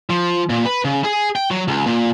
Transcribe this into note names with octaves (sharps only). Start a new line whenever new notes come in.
F3
A#2
B4
C#3
G#4
G5
F#3
C#2
A#2